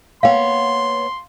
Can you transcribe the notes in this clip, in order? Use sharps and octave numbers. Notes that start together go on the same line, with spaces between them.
A#3 B3 C#5 F5 G5 C6